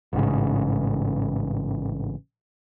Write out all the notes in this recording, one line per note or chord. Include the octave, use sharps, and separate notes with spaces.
A1 G#2 C#3